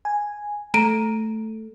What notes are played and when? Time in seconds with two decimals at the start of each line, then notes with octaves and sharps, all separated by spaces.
0.05 G#5
0.74 A3 A#5 D7 D#7